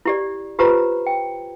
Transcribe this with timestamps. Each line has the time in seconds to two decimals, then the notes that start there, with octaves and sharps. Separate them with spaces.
0.05 E4 G4 D5
0.59 F4 G4 B4 C5 A#5
1.06 G5